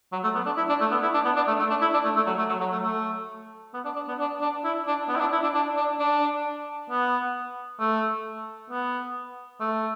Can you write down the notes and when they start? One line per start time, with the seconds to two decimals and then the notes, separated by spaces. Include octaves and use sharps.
0.12 F#3
0.24 A3
0.35 B3
0.46 D4
0.57 E4
0.69 D4
0.81 A3
0.91 B3
1.03 E4
1.14 D4
1.25 B3
1.36 D4
1.48 A3
1.59 A3
1.70 D4
1.81 E4
1.94 D4
2.05 A3
2.16 A3
2.27 F#3
2.38 A3
2.49 F#3
2.60 F#3
2.72 A3
2.83 A3
3.74 B3
3.85 D4
3.96 D4
4.08 B3
4.19 D4
4.41 D4
4.64 E4
4.87 D4
5.09 B3
5.16 E4
5.20 D4
5.32 E4
5.43 D4
5.54 D4
5.77 D4
5.99 D4
6.90 B3
7.80 A3
8.70 B3
9.60 A3